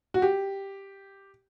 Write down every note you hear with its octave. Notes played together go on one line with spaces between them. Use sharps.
F#4
G4